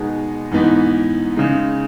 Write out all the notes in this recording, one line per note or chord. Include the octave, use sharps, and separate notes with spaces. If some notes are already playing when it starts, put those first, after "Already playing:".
Already playing: B2 G#3 B3 D#4
G#2 E3 B3 D#4
C#3 G#3 D#4